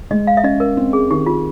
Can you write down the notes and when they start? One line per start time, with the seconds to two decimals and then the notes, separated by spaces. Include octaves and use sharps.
0.11 G#3 D#5
0.27 F5
0.37 E5
0.43 C#4 D#5
0.60 A#4
0.77 C4
0.93 G#4
1.10 D#3 G4
1.26 F4